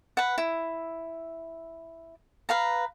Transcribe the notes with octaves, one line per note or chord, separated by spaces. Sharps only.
B4 F#5
E4
B4 F5 A#5